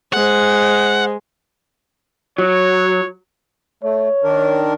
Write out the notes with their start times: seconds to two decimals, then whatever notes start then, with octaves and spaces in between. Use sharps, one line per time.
0.13 G#3 C5 F#5
2.38 F#3 C#5
3.83 A3 C#5
4.24 D#3 D4 A#4